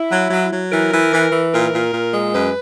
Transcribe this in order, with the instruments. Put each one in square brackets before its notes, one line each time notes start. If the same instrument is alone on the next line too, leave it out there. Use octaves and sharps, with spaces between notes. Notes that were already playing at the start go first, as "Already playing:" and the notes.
Already playing: [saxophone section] E4
F#3
F#3
F#3
E3 A#4
E3
E3
E3
A#2 A#4
A#2
A#2
G#3
F#2 B4